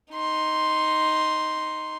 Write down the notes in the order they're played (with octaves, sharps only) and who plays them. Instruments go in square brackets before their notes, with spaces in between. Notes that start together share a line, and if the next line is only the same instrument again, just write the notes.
[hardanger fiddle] D#4 C6